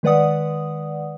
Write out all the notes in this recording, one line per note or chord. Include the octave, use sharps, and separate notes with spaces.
D#3 G#3 B4 D5 F#5 D#6